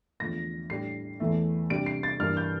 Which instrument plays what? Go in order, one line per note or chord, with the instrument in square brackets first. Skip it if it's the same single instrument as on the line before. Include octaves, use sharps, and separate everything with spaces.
[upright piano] E2 D3 F3 A3 A#6
A2 G3 D4 C7
E2 E3 A3
C3 G3 D4 D7
C7
A6
G2 E3 A#3 D4 F6
G6